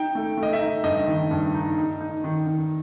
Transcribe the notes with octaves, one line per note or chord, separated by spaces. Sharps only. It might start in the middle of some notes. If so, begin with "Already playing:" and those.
Already playing: D#4 G5
A3
A3
D#5
E5
D#4
G2 D#5
D#3
G2
D#4
D#4
D#4
D#3
D#3